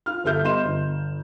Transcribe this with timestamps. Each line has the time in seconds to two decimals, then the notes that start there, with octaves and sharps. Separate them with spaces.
0.06 F4 F6
0.24 G1 G4 A4 E5 F6 G6
0.43 G3 B3 D#5 C6 E7
0.65 G1